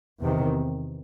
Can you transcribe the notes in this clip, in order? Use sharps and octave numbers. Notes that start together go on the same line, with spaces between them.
E2 C3 D#3